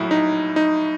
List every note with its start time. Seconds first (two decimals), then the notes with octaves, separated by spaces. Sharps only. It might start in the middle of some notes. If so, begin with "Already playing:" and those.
Already playing: A#1 A2 F#3 E4
0.11 D#4
0.56 D#4